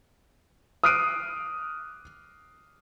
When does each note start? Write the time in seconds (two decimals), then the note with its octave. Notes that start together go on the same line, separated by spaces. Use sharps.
0.84 D#6 F6 F#6 C7 D7 D#7